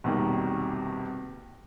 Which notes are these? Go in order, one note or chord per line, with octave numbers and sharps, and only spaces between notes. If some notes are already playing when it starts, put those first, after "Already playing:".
B1 E2 C3 D#3 G3 A#3